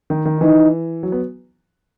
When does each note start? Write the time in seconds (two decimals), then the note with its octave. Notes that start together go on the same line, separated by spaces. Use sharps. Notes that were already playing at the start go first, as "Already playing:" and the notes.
0.10 D#3
0.25 D#3
0.41 E3 D#4
1.03 F#3
1.12 B3